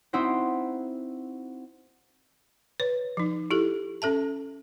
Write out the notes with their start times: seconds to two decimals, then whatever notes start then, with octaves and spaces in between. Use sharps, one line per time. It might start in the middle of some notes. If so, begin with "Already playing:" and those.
0.13 C4 D#4 E4 F#4 C5
2.80 B4 C#5
3.17 F3 D#4
3.51 E4 G4 A4
4.02 C#4 A4 E5 A5